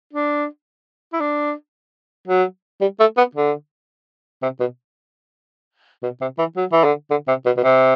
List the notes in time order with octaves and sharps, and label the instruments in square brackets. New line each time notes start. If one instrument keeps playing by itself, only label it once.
[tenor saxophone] D4
E4
D4
F#3
G3
A3
B3
D3
C3
B2
B2
C3
E3
F#3
E3
D3
D3
C3
B2
B2
C3